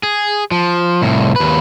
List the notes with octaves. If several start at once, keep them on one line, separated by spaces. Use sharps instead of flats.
G#4
F3
C2 A2
D#2 B4